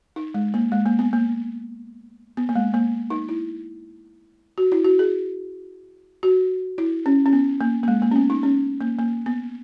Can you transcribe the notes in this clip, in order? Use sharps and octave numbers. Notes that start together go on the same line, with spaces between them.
D#4
G#3
A#3
G#3
A#3
B3
A#3
B3
A#3
G#3
A#3
D#4
E4
F#4
E4
F#4
G#4
F#4
E4
C#4
C#4
B3
A#3
A#3
G#3
A#3
C#4
B3
D#4
C#4
A#3
A#3
B3